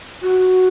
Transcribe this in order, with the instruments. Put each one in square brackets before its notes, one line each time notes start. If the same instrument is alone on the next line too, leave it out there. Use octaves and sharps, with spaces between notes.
[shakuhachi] F#4